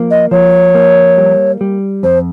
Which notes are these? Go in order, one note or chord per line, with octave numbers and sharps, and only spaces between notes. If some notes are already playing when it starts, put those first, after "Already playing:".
Already playing: F3 A#3
D#5
F3 C#5
A#3
G3
G3
F2 C5